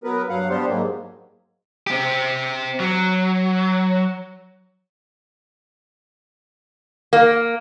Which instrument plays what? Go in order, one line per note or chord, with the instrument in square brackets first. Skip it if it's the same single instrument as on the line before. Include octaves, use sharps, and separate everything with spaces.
[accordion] F#3 B3 A#4 B4
G2 F#3 F5 F#5
G3 B3 D4 G4 C5
G#2 F#3 A#3
[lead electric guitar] C4 G4
F#3
[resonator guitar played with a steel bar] A#3